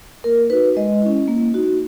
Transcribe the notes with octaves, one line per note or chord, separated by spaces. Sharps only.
A#3 A#4
D#4 F#4 B4
G#3 D#5
C#4 E4
A#3
D#4 F#4